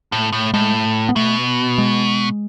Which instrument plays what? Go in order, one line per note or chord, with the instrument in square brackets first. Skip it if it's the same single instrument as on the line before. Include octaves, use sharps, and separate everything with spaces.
[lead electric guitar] A2
A2
[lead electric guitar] A2 [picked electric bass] G#3
[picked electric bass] B3
[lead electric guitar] B2 [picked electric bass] A3
[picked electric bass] G#3